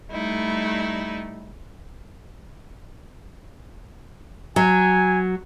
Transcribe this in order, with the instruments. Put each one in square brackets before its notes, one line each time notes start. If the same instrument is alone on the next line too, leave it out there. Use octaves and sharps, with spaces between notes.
[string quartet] G3 A3 D#4 E4
[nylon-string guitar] F#3 [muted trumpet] G#5